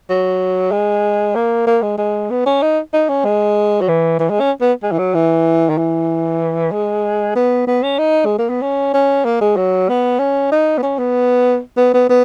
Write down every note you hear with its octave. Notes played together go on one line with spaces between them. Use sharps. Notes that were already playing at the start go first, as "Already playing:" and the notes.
F#3
G#3
A#3
A#3
G#3
G#3
B3
C#4
D#4
D#4
C#4
G#3
F#3
E3
E3
G#3
C#4
B3
G#3
E3
F#3
E3
D#3
E3
G#3
B3
B3
C#4
D#4
G#3
A#3
B3
C#4
C#4
A#3
G#3
F#3
B3
C#4
D#4
B3
C#4
B3
B3
B3
B3